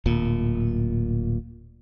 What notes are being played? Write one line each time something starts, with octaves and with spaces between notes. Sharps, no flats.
D1 A#2